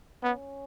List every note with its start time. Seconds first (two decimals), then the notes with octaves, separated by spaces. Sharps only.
0.23 B3 C#4